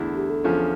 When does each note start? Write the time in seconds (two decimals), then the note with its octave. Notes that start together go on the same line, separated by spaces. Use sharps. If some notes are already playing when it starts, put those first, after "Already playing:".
Already playing: E2 D3 A3 E4
0.15 G4
0.30 A4
0.44 E2 D3 F3 C#4